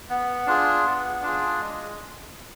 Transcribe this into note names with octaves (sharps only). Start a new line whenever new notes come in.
B3
D4 F4 G#4
B3
D4 F4 G#4
G#3